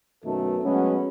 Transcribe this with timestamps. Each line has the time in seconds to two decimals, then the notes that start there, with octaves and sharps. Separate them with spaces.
0.24 F#2 B2 D#3 A3 D#4 A4
0.63 F#3 G#3 A3 B3 C#4